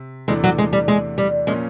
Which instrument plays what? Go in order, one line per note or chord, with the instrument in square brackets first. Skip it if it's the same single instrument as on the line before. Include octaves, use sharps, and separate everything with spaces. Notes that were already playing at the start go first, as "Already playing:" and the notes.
Already playing: [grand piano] C3
[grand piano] E2 C3 E3 A3 D4 [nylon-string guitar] G#3
[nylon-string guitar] F#3
G#3
G3
G#3
G3
[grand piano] A#2 F3 A#3 C#4 [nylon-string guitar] G#3